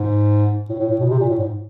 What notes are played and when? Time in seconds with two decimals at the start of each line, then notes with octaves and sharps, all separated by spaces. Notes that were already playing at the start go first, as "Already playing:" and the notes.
Already playing: G#2
0.69 A2
0.79 A2
0.89 A2
1.00 B2
1.10 C3
1.20 A#2
1.29 A2
1.39 G#2